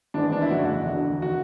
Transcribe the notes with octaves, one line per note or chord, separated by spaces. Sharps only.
G#1 G#2 E3 G#3 B3 D4
D4
E4
G1 F2 C#3 E3 F#4
E1 D2 D3
D#3 F#4